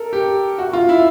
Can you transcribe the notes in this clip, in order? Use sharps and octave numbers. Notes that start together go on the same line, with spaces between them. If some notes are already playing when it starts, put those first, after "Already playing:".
Already playing: A4 A#4
G4
F#4
F4
E4